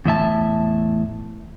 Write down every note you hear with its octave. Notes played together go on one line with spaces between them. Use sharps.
E2 A2 E5 A5